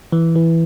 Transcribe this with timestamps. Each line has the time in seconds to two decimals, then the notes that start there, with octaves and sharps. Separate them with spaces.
0.12 E3
0.36 E3